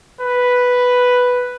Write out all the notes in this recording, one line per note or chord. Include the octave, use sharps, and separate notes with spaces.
B4